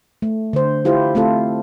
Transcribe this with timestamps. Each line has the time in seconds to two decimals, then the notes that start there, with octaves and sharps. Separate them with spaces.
0.22 A3
0.53 D3 C5
0.85 E4 F4 G4 C5
1.15 A3 C4 F4 A4